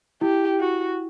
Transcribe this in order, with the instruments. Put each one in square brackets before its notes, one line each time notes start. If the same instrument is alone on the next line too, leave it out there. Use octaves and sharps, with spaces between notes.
[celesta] E4 [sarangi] G4
[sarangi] F#4